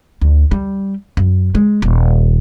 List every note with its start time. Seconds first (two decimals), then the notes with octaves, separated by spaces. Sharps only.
0.21 D2
0.51 G3
1.17 F#2
1.55 G#3
1.82 D#1